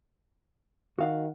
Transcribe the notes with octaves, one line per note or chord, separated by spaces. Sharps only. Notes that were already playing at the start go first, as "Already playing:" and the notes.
D#3 F#4 F5 F#5